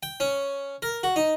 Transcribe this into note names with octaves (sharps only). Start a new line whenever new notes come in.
G5
C#4
A#4
F#4
D#4